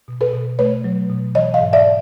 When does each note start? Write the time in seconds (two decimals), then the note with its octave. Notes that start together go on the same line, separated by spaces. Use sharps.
0.08 B2
0.21 A4 B4
0.34 B2
0.59 A3 B4 C#5
0.84 F#3
1.10 B2
1.35 E3 C#5 D#5
1.54 D#5 F5
1.61 G#2
1.73 D5 E5